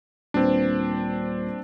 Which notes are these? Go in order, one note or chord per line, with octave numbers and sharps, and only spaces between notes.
D#1 C4 D4 B4 C5